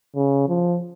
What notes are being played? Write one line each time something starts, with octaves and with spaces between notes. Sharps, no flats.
C#3
F3